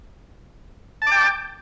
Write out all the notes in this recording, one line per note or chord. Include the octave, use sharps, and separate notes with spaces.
G5 A5 D6